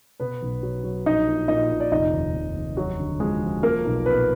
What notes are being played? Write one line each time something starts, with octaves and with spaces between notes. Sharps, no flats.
B2 B3 B4
B1
F#3
F#3
A#1 D#4 D#5
A#2
A#2 D#4 D#5
A#2
D5
F1 D#4 D#5
D#2
F1
F1
D#2 F#3 F#4
D3
F3 G#3 G#4
F3
F3 A#3 A#4
B1
A#2 B3 B4